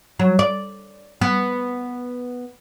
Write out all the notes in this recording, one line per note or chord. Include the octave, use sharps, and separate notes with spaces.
F#3
D5
B3